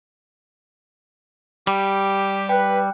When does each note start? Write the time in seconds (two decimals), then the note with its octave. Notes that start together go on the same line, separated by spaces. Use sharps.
1.67 G3 G4
2.49 B4 G5 F#6